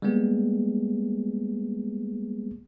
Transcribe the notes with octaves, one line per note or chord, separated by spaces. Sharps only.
G3 G#3 A#3 B3 G#4